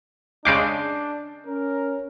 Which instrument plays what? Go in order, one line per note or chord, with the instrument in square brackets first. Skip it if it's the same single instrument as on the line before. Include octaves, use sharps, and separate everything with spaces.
[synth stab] C#3 G#3 D6 [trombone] D4 [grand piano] G6 C7 D7
[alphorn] C#4 [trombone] A#4